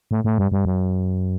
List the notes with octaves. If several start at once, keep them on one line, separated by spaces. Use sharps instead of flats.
A2
A2
G2
G2
F#2